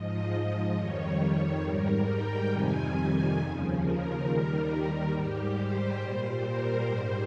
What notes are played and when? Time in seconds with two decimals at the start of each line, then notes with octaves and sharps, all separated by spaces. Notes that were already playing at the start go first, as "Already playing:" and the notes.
Already playing: G#2 F3 D#5
0.75 F2 D#3 G3 C#5
1.63 G#2 G3 A#4
2.07 G5
2.49 F2 C3 D#3 G3 G#5
3.37 D#2 C#3 F3
3.80 A#4
4.24 D#2 D#3 G3
5.11 G#2 G3 G4
5.55 C5
5.99 A#2 G3
6.43 A#4
6.86 G#2 G3 C5